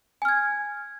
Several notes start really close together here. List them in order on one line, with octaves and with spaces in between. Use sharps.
G#5 F6 G#6